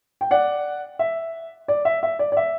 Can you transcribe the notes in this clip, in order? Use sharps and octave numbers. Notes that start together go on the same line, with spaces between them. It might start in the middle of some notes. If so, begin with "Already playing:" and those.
G5
D5 F#5
E5
D5
E5
E5
D5
D5
E5